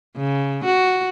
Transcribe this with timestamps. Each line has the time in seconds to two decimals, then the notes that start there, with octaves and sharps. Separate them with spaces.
0.17 C#3
0.65 F#4